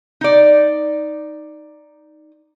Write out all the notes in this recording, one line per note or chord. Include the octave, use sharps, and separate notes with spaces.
D#4 D5